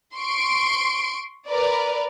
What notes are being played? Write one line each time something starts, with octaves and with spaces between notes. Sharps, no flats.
C6 C#6 D7
A#4 B4 D5